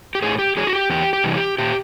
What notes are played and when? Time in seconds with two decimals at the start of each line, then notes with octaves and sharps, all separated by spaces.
0.15 G4
0.22 A2 G#4
0.39 G4
0.57 F#3 G#4
0.67 F#4
0.73 G4
0.90 E2 G4
1.13 G4
1.24 C3 E3 G3
1.36 G4
1.58 A#2 G4